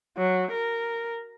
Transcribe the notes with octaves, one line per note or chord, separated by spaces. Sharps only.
F#3
A#4